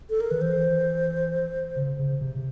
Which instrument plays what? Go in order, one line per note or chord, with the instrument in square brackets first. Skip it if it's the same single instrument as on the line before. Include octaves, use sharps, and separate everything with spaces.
[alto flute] A4
A#4
[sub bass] D#3 [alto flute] B4
[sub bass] E3 [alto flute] C5
[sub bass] C#3
C#3
C3
C3